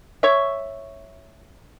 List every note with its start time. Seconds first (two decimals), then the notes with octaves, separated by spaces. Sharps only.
0.23 C#5 E5